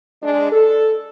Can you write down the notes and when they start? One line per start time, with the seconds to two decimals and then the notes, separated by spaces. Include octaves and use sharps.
0.22 G#3 D4
0.51 A4